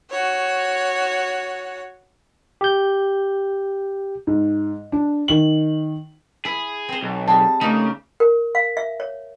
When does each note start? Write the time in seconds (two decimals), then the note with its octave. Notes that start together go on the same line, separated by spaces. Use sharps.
0.10 F#4 C#5
2.61 G4 G6
4.27 G#2
4.92 D4
5.28 D#3 F#7
6.45 E4 G#4
6.89 C4 C5
7.02 B1
7.28 G3 G#3 C4 A5
7.61 C#3 A3 A#3 D#4
8.20 A#4
8.55 F5
8.77 E5
9.00 C#5